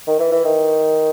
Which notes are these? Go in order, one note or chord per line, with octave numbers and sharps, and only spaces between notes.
D#3
E3
E3
D#3